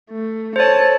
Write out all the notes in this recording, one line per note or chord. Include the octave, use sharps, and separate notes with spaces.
A3
A4 C5 C#5 A5